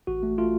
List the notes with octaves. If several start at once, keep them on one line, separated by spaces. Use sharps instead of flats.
A1 F#4
A3
A3 F4